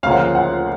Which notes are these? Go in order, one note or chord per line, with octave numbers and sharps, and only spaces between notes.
D2 C#3 F3 A#3 F5
F#5
F5
F#5